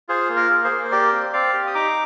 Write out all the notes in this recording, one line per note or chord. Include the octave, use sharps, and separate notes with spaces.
F4 G#4 C5
A#3
A#4
G#4
G#4 C5
A#3
C5
G4 A#4 D5
C4
C4 D5 F5
G4
D#6
D#4 A#5 D6